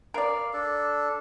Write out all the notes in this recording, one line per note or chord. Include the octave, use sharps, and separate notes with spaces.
A#4 D5 F5
D4 A4